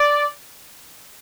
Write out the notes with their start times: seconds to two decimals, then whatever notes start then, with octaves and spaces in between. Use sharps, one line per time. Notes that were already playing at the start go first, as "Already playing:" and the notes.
Already playing: D5